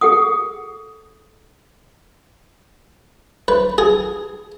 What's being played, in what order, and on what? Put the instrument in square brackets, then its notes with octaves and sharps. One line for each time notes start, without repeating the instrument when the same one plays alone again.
[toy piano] G#4 A4 F#5 D#6
[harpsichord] B4
G#4